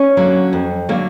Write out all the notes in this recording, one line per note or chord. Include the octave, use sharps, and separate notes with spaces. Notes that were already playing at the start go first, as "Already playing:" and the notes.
Already playing: C#4 C#5
D3 F#3 A#3
F2
D3 F#3 A#3